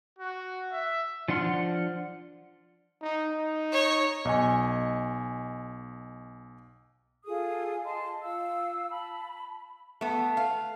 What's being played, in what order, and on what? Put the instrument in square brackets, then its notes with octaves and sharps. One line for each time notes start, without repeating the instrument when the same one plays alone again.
[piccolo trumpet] F#4
E5
[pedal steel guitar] F3 D4 F#5 C6 F6
[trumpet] D#4
D#4
[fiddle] C#5
[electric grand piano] B1 D#5 G#5
[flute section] F4 G#4 A4 D#6
D#5 A5 C6
F4 F5 E6
A5 B5
[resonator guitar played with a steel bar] A3 B3
F5